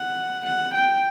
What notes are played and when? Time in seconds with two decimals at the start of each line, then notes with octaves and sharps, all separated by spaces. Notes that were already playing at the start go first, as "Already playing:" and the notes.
Already playing: F#5
0.47 F#5
0.75 G5